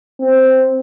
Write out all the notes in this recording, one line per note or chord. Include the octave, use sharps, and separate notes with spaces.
C4